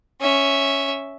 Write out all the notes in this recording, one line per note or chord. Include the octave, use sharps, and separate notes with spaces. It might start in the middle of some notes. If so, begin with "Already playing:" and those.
C#4 E5